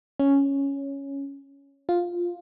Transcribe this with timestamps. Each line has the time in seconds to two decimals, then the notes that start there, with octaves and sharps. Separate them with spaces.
0.20 C#4
1.89 F4